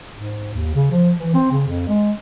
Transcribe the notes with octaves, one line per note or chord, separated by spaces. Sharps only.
G#2
D#2
C#3
F3
E3
C4
C#3
F2
G#3